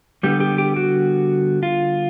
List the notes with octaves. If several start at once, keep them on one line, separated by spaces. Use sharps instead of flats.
D3 G3 B3 E4 G4
G4
G4
F#4
F4